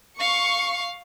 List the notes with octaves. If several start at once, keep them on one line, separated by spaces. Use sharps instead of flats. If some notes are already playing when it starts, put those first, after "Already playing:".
F5 C#6